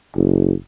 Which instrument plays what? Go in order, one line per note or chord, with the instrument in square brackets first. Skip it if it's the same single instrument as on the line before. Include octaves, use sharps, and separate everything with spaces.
[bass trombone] F#1